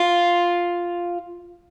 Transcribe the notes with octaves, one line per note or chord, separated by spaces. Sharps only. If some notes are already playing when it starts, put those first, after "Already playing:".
Already playing: F4